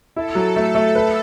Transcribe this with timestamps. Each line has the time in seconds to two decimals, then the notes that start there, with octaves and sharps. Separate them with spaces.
0.16 E4 A4
0.35 F#3
0.56 A3
0.75 A3
0.95 B4